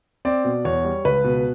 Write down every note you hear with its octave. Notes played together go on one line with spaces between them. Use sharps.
C4 D5
B2
E2 C#5
G3
C#2 B4
B2